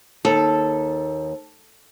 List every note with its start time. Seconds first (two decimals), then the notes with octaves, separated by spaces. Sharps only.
0.25 D#2 A4